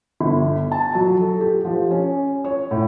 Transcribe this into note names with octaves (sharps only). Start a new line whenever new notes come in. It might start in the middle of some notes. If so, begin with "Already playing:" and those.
G1
A5
F#3
A4
G4
F3
C#4
C#5
A2